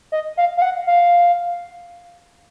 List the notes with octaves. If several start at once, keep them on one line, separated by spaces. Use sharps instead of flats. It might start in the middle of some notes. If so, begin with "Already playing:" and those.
D#5
F5
F5
F#5
F5